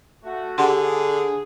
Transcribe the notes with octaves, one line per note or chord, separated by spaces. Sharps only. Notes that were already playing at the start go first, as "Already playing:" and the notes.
A3 F#4
D3 G4 G#4 F#5 C6